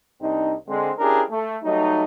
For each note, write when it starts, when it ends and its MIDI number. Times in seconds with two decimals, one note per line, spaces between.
0.22 0.54 36
0.22 0.54 60
0.22 0.54 62
0.22 0.54 63
0.68 0.91 50
0.68 0.91 56
0.68 0.91 60
0.99 1.22 61
0.99 1.22 62
0.99 1.22 64
0.99 1.22 67
0.99 1.22 68
0.99 1.22 70
1.30 1.57 57
1.63 2.04 54
1.63 2.04 55
1.63 2.04 57
1.63 2.04 63